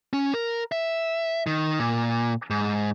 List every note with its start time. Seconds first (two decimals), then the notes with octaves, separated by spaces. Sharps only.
0.13 C#4
0.34 A#4
0.72 E5
1.47 D#3
1.80 A#2
2.50 G#2